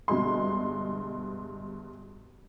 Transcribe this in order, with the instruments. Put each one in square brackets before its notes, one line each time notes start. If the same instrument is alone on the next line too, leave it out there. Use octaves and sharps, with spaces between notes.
[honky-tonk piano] G1 G2 B2 G#3 C6